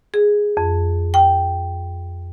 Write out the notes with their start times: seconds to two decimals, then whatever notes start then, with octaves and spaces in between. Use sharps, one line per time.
0.14 G#4
0.57 F2
1.14 G5